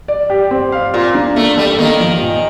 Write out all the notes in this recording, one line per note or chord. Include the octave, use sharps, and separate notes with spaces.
D5
G4
C4
F5
A#2 F4
D4
A3 A#3
G3 A4
D#3 A#3
F3
A#2